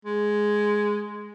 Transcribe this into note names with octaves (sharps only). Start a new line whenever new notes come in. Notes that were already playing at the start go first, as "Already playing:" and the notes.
G#3